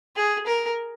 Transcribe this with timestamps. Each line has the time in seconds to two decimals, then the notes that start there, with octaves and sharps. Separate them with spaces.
0.16 G#4
0.47 A#4